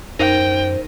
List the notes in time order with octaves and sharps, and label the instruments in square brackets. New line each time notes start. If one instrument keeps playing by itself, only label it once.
[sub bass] F#2 [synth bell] D#4 A#4 [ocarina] C5 [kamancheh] G5